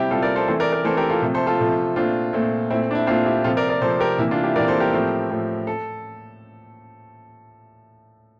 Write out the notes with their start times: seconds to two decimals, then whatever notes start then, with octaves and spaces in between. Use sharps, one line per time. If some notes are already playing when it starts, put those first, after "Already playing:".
Already playing: C3 G3 C4 E4 G4
0.10 C3 G3 C4 F4 A4
0.23 A#4 D5
0.36 A4 C5
0.48 E3 A3 C4 A4 C5
0.60 A#4 D5
0.72 A#4 D5
0.85 E3 A3 C4 A4 C5
0.97 G4 A#4
1.10 F4 A4
1.22 C3 F3 A3
1.35 A4 C5
1.47 F4 A4
1.59 C3 F3 A3
1.96 A#2 A3 C4 D4 F4
2.33 A#2 A3 C4
2.70 A#2 A3 C4 E4
2.91 D4
2.95 E4
3.07 A#2 A3 C4 D4 F4
3.26 E4 G4
3.44 C3 F3 C4 F4 A4
3.57 A#4 D5
3.69 A#4 D5
3.82 C3 F3 C4 A4 C5
4.00 G4 A#4
4.18 C3 E3 A#3 E4
4.31 D4 F4
4.43 E4 G4
4.56 A#3 A#4 D5
4.58 C3 E3
4.68 A4 C5
4.80 G4 A#4
4.93 A2 F3 A3 C4
5.30 A2 F3 A3 C4
5.67 A4